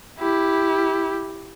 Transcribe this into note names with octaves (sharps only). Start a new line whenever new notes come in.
E4 G4